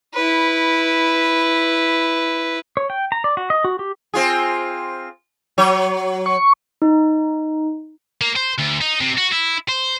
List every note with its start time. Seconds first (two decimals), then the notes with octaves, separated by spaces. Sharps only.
0.14 E4 B4
2.77 C#5
2.90 G5
3.12 A#5
3.24 D5
3.37 F#4
3.50 D#5
3.64 F#4
3.79 G4
4.14 C4 F4 G#4
5.58 F#3 C#5
6.26 C#6
6.82 D#4
8.21 A#3
8.36 C5
8.59 D2
8.81 D#4
9.01 C3
9.17 F#4
9.32 E4
9.69 C5